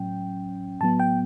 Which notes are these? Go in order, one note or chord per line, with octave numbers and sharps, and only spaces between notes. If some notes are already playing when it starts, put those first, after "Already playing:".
Already playing: A2 F#3 C#4 G5
A2 F#3 B3 A5
G5